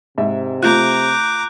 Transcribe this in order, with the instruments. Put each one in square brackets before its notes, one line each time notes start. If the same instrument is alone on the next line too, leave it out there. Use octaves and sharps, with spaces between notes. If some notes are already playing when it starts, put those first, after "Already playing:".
[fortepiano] G#2 E5 [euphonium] C3
[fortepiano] A3 F4 [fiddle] A#5 D6 [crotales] F#6 G6